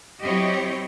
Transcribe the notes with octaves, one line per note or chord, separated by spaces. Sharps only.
F#3 C4 E4 G4 C#5 D#5